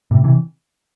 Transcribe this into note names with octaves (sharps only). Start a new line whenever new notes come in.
A2 C3
C3 E3